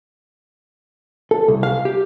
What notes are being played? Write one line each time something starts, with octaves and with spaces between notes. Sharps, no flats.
A4
C2
F5
G4